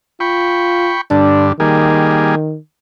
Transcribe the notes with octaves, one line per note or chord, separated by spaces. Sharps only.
F4 G5 B5 C#6
G2 D3 D4
D#3 G3 A#3 G#4